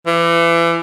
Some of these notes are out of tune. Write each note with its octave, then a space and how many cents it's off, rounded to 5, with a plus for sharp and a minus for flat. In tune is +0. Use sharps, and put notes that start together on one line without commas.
E3 +35